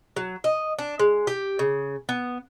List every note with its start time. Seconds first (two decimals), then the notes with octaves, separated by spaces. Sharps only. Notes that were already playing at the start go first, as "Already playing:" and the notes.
0.16 F#3
0.44 D#5
0.78 D4
0.99 G#3
1.27 G4
1.59 C#3
2.09 B3